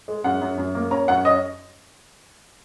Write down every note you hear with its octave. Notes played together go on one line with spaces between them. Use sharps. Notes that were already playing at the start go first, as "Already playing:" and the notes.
G#3
F#2 F#5
F#2
F#2
A#3
C#4 A#5
F#2 F#5
C#4 D#5